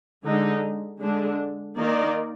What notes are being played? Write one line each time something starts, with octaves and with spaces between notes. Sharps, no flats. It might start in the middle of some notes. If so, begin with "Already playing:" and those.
D3 G#3 D#4
D3 G#3 D4
D#3 A#3 D#4 A#4 D5